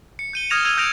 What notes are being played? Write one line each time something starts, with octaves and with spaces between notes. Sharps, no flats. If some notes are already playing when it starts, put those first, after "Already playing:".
C#7
G6 D#7 G7
D#6 F6 G#6 A#6 E7 F7
E6 G#6 D#7 F7
D#6 G6 A#6 D7 F7